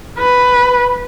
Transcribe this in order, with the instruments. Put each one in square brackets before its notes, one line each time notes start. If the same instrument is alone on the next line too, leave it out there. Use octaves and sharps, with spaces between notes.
[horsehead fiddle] B4